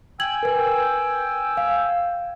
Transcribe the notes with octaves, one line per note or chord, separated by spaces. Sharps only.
G5 G#5 E6 G#6 F#7
A#4 B4
F5